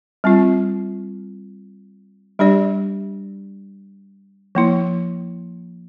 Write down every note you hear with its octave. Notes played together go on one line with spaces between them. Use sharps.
G3 C4 F4
G3 D4 G4 D5
F3 A#3 E4